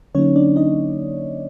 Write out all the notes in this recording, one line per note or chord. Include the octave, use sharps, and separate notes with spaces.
D3 F#3 A#3 C#4 D#4 C#5
D4 D5
D#4 D#5